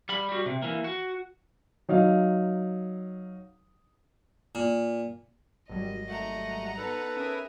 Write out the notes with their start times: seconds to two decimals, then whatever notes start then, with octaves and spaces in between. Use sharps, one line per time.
0.09 G3 B5
0.29 G3 F#4
0.46 C3
0.62 E3 A#3
0.84 F#4
1.89 F#3 D#4 F5
4.55 A#2
5.69 G#1 F#3 G3 D#5
6.08 A3 F#5 A#5
6.77 B3 D#4 A4 B4
7.16 C#4 G#4 A#4 E5 D#6